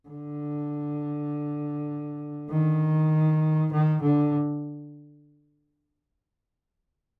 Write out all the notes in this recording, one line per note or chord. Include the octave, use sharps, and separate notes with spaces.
D3
D#3
D#3
D3